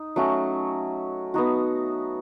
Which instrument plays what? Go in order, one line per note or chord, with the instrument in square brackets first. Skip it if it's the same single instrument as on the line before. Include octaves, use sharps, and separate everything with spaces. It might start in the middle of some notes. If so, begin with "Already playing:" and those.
Already playing: [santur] D#4
F#3 A3 C#4 F#4
B3 D#4 F#4